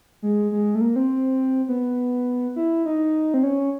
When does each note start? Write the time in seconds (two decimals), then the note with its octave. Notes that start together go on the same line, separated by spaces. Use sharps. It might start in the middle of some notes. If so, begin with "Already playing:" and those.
0.22 G#3
0.52 G#3
0.75 A3
0.81 A#3
0.96 C4
1.68 B3
2.56 E4
2.86 D#4
3.34 C4
3.43 C#4